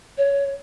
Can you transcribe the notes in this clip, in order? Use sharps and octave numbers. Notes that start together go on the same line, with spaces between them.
C#5